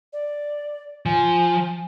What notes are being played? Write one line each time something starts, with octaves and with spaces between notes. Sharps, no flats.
D5
F3 G#5